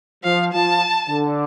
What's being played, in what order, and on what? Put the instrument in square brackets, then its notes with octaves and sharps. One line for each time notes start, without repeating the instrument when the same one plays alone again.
[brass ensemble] F3 [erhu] F5
[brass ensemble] F3 [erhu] A5
[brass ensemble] D3